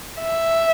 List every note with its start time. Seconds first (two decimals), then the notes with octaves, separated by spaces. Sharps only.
0.22 E5